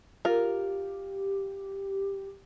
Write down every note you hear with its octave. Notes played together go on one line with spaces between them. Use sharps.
F4 G4 A#4